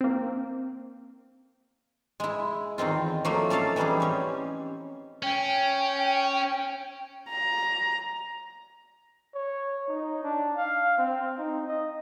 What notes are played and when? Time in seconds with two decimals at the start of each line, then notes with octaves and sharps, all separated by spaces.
0.01 A#3 C4
2.20 G#3 E4
2.78 E2 D#3 C4 F4
3.25 F3 F#3 A3 A#3 F#4
3.50 C#4 A4 D5 F5 A5
3.76 E3 G3 B3 D#4 G#4
4.00 C4 C#4 G4
5.23 C#4 G5
7.30 A#5
9.35 C#5
9.88 D#4
10.23 D4
10.57 F5
10.98 C4
11.38 D#4
11.68 D#5